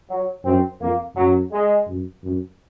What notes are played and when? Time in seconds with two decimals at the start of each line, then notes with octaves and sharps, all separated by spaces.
0.10 F#3
0.45 F#2 C4
0.81 F2 A#3
1.17 F#2 F#3
1.52 G#3
1.88 F#2
2.24 F#2